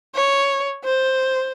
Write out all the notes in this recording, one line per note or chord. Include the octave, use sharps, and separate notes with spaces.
C#5
C5